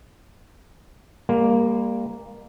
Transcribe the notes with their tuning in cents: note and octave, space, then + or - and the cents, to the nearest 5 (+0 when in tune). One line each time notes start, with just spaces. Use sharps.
G3 +45 A#3 +0